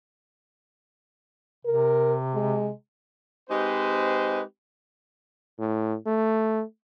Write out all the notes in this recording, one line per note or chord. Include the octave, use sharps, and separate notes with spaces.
C3 A#4
G#3
G#3 C4 D#4 G4 B4 C5
A2
A3